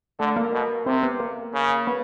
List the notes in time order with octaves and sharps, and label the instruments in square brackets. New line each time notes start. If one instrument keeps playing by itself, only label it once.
[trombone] D3 [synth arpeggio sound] A3 A4
[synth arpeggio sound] A#3 A#4
[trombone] B2
[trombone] C3 [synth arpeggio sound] C4 C5
[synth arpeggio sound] B3 B4
A#3 A#4
[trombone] C#3
[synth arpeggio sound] B3 B4